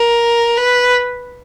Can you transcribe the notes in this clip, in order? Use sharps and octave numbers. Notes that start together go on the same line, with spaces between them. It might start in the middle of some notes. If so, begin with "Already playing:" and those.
Already playing: A#4
B4